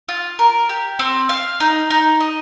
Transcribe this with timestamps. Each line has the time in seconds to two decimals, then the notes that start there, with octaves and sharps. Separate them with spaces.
0.09 F4
0.39 A#4
0.69 G4
0.99 C4
1.29 F5
1.60 D#4
1.90 D#4
2.20 D#5